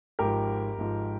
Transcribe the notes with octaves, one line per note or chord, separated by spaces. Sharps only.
G#1 G#2 F3 G4 A#4
G#1 G#2 F3